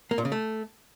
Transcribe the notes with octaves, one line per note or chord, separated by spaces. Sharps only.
A#3
A#2
C#3
A3